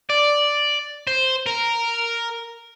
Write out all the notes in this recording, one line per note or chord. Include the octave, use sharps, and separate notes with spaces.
D5
C5
A#4